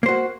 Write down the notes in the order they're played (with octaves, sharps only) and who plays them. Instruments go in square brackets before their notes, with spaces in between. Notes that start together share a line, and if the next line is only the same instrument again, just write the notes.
[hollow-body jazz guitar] A#3
C5
F#4